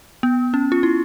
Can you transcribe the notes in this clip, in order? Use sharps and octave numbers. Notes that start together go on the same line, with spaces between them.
B3
C#4
F4
E4